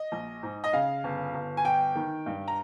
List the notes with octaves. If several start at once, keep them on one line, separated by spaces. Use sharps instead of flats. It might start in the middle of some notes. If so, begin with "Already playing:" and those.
Already playing: D#5
A#1
G#2
D#5
C#3 F5
G1
G1
G#5
G1 G5
D#3
G2
A#5